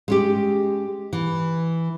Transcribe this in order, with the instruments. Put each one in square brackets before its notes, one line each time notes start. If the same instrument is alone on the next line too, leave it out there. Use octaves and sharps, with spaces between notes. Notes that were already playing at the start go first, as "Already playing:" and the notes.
[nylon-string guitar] G#3 C#4 G4
E3